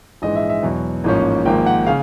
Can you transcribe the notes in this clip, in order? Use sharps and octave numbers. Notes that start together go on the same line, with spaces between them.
A#1 G#2 E3 G#3 D#5
E5
E5
E2 B2 F#3
A1 G#2 F3 A#3 C#4
G#1 G#2 F3 A#3 G5
F#5
C#3 F5